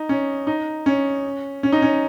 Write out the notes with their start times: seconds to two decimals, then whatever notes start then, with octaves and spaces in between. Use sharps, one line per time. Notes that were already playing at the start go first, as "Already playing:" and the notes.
Already playing: D#4
0.09 C#4
0.47 D#4
0.86 C#4
1.63 C#4
1.72 D#4
1.82 C#4